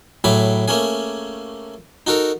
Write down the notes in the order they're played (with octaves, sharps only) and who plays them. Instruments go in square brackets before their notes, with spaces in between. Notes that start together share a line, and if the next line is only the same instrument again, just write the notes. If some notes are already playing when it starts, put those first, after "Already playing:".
[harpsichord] A2 F#3 A3 G#4 B5 D6
A3 A#3 C#4 G#4
D#4 F#4 A4 A#4